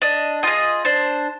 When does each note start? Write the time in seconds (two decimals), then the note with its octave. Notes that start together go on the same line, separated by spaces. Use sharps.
0.02 D4 D#5
0.43 F4 G#4 D#5
0.85 D4 C5